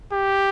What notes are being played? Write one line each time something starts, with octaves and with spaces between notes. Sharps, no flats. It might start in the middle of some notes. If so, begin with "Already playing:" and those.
G4